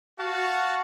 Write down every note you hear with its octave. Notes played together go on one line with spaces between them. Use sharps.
F#4 F5 A5